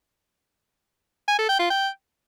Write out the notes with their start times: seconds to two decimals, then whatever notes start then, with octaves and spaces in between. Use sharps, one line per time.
1.28 G#5
1.39 A4
1.49 G5
1.60 F4
1.70 G5